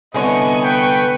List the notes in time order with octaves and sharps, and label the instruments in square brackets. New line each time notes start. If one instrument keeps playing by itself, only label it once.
[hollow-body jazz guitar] C2 D3 C#5 [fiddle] B3 C#6 [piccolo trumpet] D#5 [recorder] G#5
[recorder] B4 [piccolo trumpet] G5